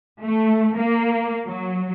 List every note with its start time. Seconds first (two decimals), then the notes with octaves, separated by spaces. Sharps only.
0.22 A3
0.77 A#3
1.47 F#3